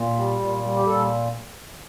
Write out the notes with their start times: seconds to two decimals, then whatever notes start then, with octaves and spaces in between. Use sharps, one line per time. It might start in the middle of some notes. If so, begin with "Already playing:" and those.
Already playing: A#2
0.16 G3
0.39 A#2
0.63 G3
0.76 G4
0.86 A#2 A4